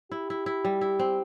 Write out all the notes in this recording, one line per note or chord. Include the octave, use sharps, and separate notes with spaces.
E4 G4
E4
E4
G3
E4
C4